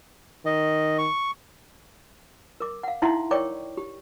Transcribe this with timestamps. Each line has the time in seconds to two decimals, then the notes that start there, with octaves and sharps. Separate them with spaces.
0.46 D#3 D#5
0.98 C#6
2.60 A#4 D6
2.83 F5 F#5
3.02 D#4 E4 E5 F#5 A#5 C6
3.31 A#4 C#5 D5 G5 C#6 D6
3.77 G4